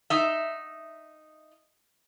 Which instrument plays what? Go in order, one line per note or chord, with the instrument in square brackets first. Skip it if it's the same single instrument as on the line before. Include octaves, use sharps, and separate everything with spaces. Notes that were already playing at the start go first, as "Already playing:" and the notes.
[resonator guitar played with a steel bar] D#4 E5